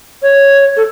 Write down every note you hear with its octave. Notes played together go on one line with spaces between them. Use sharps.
C#5
A4